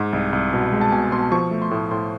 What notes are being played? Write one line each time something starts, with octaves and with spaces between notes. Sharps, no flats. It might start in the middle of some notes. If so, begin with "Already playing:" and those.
Already playing: G#2
C2
C2
B2
G#3
A5
B2 G#5
B2 C6
F3 C#6
A3
C6
A2
A2 C6